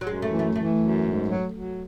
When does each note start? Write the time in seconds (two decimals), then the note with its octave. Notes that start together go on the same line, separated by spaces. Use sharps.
0.01 F#3
0.07 F#2 G#3
0.22 A3
0.31 E3
0.39 A3
0.55 E3 A3
0.79 F#2
1.04 G#2
1.28 F#3
1.52 F#3